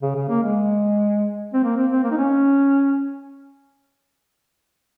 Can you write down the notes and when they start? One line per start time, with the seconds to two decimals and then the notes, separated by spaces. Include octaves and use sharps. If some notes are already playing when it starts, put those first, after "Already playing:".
0.02 C#3
0.15 C#3
0.29 A#3
0.42 G#3
1.53 C4
1.63 A#3
1.77 C4
1.92 C4
2.03 A#3
2.11 D#4
2.17 C#4